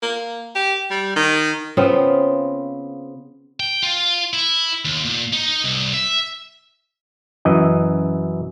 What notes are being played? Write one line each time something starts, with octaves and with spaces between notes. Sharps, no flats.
A#3
G4
G3
D#3
C#3 B3 C4 F4
G5
F4
E4
D#2
A#2
D#4
C2
E5
F#2 E3 D#5